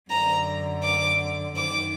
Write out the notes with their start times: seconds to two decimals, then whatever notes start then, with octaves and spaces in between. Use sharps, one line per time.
0.10 F#2 D3 A#5
0.83 D6
1.56 F#2 D#3 D6